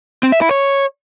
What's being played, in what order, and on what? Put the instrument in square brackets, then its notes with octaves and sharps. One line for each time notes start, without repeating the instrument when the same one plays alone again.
[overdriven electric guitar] C4
E5
E4
C#5